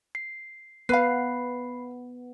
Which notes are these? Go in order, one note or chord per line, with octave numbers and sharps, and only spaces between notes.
C7
B3 B4 F5 B5 C7